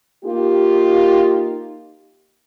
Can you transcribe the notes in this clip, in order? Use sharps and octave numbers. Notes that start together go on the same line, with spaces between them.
A#3 D#4 F4 G4